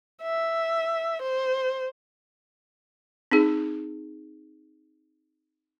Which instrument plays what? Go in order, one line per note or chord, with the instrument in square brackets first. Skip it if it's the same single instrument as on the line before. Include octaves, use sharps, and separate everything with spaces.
[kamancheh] E5
C5
[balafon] C4 D#4 G#4